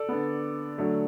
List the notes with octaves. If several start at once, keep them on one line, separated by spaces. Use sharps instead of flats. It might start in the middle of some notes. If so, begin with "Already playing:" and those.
Already playing: A4 D5
D3 B3
D3 F#3 A3